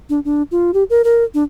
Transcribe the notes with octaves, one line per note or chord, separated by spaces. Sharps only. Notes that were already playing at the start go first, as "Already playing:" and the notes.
D4
D4
F4
G4
A#4
A#4
D4